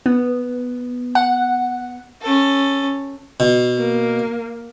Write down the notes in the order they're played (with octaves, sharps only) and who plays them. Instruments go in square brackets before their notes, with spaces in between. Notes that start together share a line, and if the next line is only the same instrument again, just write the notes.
[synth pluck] B3
F#5
[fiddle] C#4 A4
[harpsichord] B2
[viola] A#3